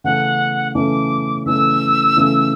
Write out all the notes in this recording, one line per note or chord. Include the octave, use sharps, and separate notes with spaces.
C#3 E3 A3 C#4 F#5
C#3 E3 A3 C#4 D6
C#3 E3 A3 C#4 E6
C#3 E3 A3 C#4